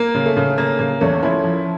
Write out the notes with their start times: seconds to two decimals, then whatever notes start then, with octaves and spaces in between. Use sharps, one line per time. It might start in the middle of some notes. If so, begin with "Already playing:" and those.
Already playing: A#3
0.15 C#3
0.26 A3
0.37 C#3
0.58 C#3 A#3
0.79 C#3 A#3
1.01 E2 A3 C#4
1.23 F3 C#4 E4
1.44 F3